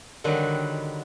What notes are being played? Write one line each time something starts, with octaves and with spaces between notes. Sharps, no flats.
D3 D#3 F#3 G3 F#4 B4